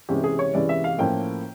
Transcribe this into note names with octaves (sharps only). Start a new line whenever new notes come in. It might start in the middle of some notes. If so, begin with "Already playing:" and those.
C3 E3 G#3 C#4 G4
G#4
C#5
C3 E3 G#3 C#4 D5
E5
F5
A2 F3 A#3 C#4 G5